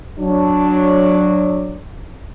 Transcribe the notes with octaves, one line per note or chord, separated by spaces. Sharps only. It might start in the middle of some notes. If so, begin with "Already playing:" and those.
F#3 D4